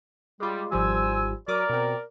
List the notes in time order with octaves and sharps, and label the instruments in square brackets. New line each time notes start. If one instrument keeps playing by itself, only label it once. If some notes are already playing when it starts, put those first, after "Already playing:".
[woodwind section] G3 [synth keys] G#3 F4
[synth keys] G#1 F3 G3 [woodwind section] C5 G#5 E6
[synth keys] F#3 D6 D#6 [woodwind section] A#4 D5
[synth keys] B2 C4